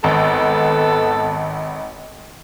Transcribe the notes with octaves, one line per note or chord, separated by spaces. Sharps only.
G#1 B3 A4